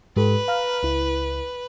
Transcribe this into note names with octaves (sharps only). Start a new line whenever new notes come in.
G#2 G4 A4 B4
F5 A#5 F6
C#2 E4